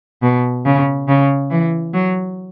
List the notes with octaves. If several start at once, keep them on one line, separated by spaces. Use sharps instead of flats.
B2
C#3
C#3
E3
F#3